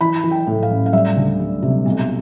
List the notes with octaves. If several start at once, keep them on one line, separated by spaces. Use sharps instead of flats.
E3 B5
E3
G5
A2
F5
A1
F5
G3 E5
D2
G3
C3
B1